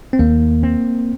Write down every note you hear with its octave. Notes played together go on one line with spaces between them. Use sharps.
C4
D#2 A#3
C4